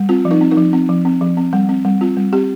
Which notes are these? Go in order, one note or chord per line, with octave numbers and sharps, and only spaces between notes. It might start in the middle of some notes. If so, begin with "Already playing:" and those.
Already playing: G3
C4 F4
F3
D#4
C4
D#4
F3
C4
F3
C4
F3
C4
G3
C4
G3
C4 F4
G3
C4 G4